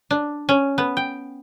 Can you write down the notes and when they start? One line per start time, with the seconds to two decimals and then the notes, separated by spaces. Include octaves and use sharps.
0.11 D4
0.49 C#4
0.78 B3
0.97 G5